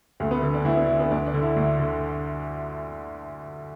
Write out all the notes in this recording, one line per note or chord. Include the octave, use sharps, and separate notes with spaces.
D2 A3
B3
D3 B3
D4
D2 E4
B3
D3
B3
D2 D4
D4
D3
E4
D2
D3